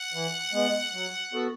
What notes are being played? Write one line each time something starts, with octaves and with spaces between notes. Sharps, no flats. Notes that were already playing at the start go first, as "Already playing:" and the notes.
Already playing: F#5
E3
G#3 B3
F#3
B3 F#4 A4